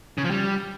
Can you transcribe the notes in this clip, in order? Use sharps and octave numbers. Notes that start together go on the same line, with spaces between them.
C#3
F3
G3